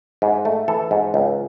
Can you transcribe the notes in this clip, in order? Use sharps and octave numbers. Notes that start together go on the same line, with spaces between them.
G#2
A3
E3 A4
G#2
C#2